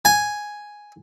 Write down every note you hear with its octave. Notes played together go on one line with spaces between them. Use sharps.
G#5